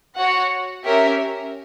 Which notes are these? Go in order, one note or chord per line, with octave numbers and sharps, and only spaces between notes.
F#4 C#5 F#5
C#4 G4 A#4 E5